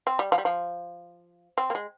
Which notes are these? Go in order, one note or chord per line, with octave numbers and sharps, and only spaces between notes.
C4
G3
F3
G3
F3
C4
A#3
G#3